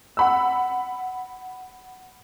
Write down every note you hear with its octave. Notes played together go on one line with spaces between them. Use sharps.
F#5 B5 E6